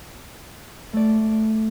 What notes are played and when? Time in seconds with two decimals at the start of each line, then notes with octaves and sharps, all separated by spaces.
0.93 A3 D5